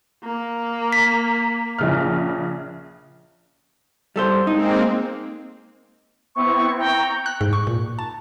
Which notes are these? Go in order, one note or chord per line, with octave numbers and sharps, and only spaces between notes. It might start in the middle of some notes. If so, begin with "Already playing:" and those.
A#3
B6
A#1 C#3 F6
G3 A4 C5
G#3 A#3 C4 D#4
B3 C4 E4 C#6
G5 A#5 C#6
F#6
G#2
C#6
A#2
A5